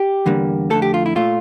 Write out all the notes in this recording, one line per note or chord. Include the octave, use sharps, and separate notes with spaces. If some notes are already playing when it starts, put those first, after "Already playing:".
Already playing: G4
E2 D3 G3 A#3
F2 D3 A3 A4
G4
F4
E4
A#2 A3 F4